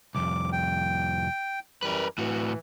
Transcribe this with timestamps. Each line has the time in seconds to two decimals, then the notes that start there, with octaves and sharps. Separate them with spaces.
0.15 C2 F2 D6
0.52 G5
1.83 F#2 E3 G3 A#4 B4
2.18 A2 E3 F#4